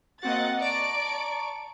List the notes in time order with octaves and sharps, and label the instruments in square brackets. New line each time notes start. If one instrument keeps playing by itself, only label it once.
[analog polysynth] A#3 C4 F#4 [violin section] D#5 F#5 A6
[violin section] D5 D7 [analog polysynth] A5 A#5 C#6